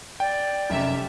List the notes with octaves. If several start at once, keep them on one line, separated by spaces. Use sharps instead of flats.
D5 G5
F1 F#2 G4 E5